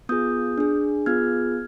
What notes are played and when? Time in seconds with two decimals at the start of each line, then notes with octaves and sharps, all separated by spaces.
0.09 B3 F4 G#4 D#6 G6
0.58 D4 G#4
1.06 B3 F4 G#4 F6 G#6